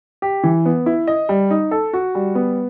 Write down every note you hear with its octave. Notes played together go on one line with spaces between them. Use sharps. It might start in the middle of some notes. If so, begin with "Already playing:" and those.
G4
E3
B3
E4
D#5
G3
D#4
A4
F#4
G3
B3